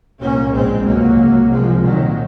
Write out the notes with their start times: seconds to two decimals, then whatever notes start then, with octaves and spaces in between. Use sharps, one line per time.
0.20 C2 A#2 A#3 C#4
0.52 A#1 G#2 G#3 C4
0.84 C#2 C3 F#3 A#3
1.17 C#2 C3
1.49 C2 C3 F3 G#3
1.82 C2 A#2 D#3 F#3